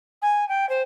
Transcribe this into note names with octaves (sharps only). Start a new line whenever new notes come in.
G#5
G5
C5